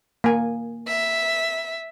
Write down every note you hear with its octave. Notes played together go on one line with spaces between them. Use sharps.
A#3 G#5
E5